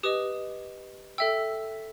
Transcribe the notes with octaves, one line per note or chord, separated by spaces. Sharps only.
G4 B4 D#5 D#6
A4 E5 G5 E6